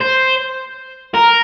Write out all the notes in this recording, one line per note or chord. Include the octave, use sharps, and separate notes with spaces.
C5
A#4